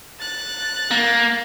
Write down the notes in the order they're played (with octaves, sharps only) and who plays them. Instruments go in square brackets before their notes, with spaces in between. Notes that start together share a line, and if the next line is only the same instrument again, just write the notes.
[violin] F#6 A6
[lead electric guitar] A#3